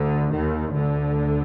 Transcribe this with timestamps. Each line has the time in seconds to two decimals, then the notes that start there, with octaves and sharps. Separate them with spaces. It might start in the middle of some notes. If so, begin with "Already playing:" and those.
Already playing: D2 D3
0.33 D#2 D#3
0.76 D2 D3